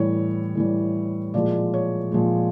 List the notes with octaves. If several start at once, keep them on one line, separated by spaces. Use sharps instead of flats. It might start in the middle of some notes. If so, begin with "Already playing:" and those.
Already playing: A2 E3 G3 C#5
A2 E3 G3
A#2 F3 G#3 D5
C#5
A#2 F3 G#3